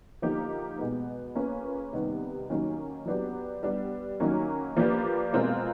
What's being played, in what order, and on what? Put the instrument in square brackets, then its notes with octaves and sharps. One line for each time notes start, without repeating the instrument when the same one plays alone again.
[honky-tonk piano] D3 F3 A#3 D#4 G4
B2 G#3 B3
A#3 C#4 F4 G#4 B4
C3 D#3 G3 B3
D#3 F#3 A#3 C#4
F#3 B3 D4 G4
G3 B3 D4
D#3 F#3 A#3 C#4
F3 A#3 D4 G4 B4
B2 G#3 C4 F4 A#4